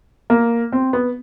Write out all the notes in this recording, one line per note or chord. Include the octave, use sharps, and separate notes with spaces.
A#3
C4
B3